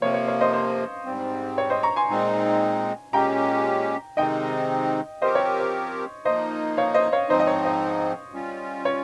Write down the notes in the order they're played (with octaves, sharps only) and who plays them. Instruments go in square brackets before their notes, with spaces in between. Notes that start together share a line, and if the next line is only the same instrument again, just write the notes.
[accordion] F2 C3 F3 A#3 [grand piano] C#5
[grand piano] C#5
C#5 F5
C5 D#5
C5
[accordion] G#2 G3 C4
[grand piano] C#5
C5 D#5
A#5 C#6
G#5 C6
[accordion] A#2 G#3 C4 D#4
[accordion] A#2 G#3 C#4 G4 [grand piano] G5 A#5
[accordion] C3 D#3 G#3 C4 D#4 [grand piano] D#5 G5
[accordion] F3 C4 G4 A#4 [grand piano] C5 D#5
[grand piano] C#5
C5
[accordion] F3 A#3 D#4 [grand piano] C5 D#5
[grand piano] C#5 F5
C5 D#5
C#5 F5
[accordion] G#2 F3 C4 D#4 [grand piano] C5 D#5
[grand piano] D#5
C#5
C5 D#5
[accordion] G3 C#4 F4
[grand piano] C#5